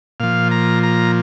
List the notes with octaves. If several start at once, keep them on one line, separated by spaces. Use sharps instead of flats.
A#2 F3 F5
A#5
A#5